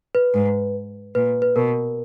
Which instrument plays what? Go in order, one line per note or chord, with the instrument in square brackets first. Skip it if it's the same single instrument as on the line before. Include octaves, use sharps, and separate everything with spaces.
[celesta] B4
[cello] G#2
[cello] A#2 [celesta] B4
[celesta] B4
[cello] B2 [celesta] A#4